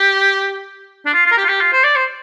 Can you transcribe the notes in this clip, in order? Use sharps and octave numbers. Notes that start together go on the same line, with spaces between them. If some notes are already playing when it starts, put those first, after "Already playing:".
Already playing: G4
D4
F4
F4
A#4
G4
F4
G4
F4
C5
D5
C5